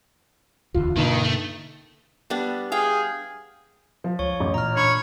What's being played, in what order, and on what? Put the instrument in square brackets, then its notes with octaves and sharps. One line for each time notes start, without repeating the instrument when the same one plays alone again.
[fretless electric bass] D1 E2 D3 [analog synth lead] F4
[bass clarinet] G2 [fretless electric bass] B2 D3 A#3 [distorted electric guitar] D#3 [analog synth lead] D#4
[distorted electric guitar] A3
[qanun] G3 B3 D4
[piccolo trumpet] G#4 [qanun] F5 G5
[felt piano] F3
[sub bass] C#2 [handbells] C#5 C#6
[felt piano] A1 [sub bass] F#2
[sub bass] A#2 [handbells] A#5 F6
[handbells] D4 B5 C#6 [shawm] C#5